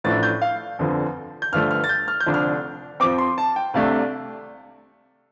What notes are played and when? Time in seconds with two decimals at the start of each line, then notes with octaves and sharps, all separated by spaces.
0.04 A1 A2 F3 A3 D4 A6
0.23 G6
0.42 F5
0.79 G1 F2 D3 F3
1.42 G6
1.52 G1 G2 D3 F3 A3 F6
1.71 F6
1.84 A6
1.89 G6
2.08 F6
2.20 G6
2.27 F1 F2 D3 F3 D4
2.34 F6
3.00 F2 F3 C4 D6
3.18 C6
3.38 A5
3.56 G5
3.74 C2 C3 A3 D4 F5